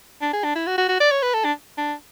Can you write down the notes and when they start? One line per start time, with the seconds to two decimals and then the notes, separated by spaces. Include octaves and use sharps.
0.22 D4
0.33 G#4
0.44 D4
0.56 E4
0.67 F#4
0.78 F#4
0.89 F#4
1.00 D5
1.11 C#5
1.22 B4
1.34 A4
1.44 D4
1.78 D4